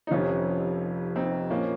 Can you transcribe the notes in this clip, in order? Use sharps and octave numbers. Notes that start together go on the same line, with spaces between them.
D#4
F1 F2 C3 F3 C#4 F4
C4 D#4
A#2 F3 A#3 C#4